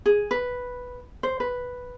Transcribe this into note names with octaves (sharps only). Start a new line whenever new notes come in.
G#4
B4
C5
B4